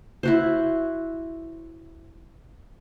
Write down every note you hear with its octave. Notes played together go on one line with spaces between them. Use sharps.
E4 F#4 C5